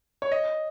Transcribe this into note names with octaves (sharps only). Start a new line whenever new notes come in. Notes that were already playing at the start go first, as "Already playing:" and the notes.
C#5
D#5